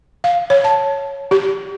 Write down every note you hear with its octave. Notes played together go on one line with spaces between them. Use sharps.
F5
C#5
A5
G4